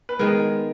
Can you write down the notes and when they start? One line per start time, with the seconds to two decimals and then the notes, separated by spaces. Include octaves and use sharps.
0.09 B4
0.19 D#3 G#3 B3 A#4